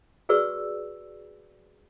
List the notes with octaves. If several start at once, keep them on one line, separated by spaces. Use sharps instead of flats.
F#4 G#4 B4 D5 C#6 E6